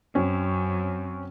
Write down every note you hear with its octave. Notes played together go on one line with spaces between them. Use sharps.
F#2 C4 C#4